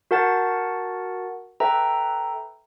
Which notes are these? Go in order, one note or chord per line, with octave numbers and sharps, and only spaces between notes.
F#4 A#4 F#5 A5 A6
A4 B4 E5 G5 A#5